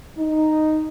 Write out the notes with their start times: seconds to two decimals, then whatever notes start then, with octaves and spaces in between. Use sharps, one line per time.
0.18 D#4